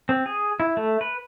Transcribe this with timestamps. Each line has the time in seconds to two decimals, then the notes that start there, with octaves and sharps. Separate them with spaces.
0.09 C4
0.26 G#4
0.60 E4
0.77 A3
1.01 B4